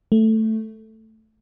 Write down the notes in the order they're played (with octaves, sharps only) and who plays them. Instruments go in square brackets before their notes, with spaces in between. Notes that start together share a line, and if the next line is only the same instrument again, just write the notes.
[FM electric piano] A3